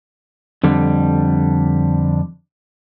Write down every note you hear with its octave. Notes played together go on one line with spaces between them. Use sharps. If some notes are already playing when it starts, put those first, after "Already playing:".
F2 D3 G3